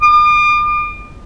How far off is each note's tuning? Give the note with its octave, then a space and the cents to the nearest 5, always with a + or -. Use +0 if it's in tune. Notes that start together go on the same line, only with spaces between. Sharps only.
D6 +45